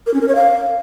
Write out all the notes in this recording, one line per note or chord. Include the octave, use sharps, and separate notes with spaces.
A#4
C#4
A#4
C#5
F5